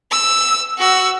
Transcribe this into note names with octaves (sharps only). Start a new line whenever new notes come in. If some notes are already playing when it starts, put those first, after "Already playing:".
E6
F#4 E6